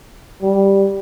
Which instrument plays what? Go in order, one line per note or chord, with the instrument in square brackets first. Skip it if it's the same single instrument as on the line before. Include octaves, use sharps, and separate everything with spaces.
[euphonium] G3